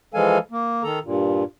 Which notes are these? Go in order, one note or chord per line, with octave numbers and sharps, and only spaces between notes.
E3 F3 G#3 A4 F5 G#5
A#3
D#3 A4 A#5
G2 A#2